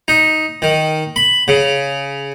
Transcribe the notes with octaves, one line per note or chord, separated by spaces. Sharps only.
D#4
D#3
B5
C#3